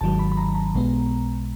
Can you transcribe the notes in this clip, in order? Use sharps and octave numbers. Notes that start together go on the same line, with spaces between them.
G#1 G#2 D#3 F#3 A5
B5
B5
A#5
A#5
B1 B2 G#3 B3